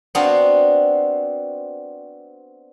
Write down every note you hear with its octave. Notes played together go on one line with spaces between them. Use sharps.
B3 C4 D4 F#4 F5